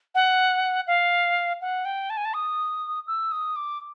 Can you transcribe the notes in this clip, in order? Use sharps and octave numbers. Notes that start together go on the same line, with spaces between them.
F#5
F5
F#5
G5
A5
G#5
A5
D#6
E6
D#6
D6